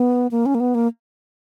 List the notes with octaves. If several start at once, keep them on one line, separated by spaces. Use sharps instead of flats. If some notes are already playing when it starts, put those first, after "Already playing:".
Already playing: B3
A#3
C#4
A#3
B3
A#3